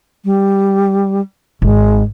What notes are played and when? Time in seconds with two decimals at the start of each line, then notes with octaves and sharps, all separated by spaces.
0.25 G3
1.62 G#1 G#3